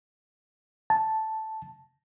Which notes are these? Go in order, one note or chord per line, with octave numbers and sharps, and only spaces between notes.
A5